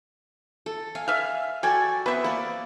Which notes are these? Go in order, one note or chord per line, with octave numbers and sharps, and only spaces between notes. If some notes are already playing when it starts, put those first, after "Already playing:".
A4
F5 G#5
E5 F5 G#5
F#4 A4 D5 G5 G#5
B3 C4 B4 E5
A#3 D5